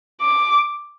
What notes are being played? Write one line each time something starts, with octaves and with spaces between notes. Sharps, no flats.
D6